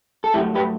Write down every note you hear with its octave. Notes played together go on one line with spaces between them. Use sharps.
A4
G2 F#3 A3 E4 G4
G4 B4